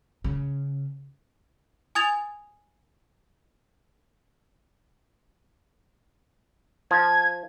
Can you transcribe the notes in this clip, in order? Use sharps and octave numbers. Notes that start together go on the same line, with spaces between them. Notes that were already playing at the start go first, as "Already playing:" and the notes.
C#3
G#5 D#6 G#6 A6 F7
F3 G#6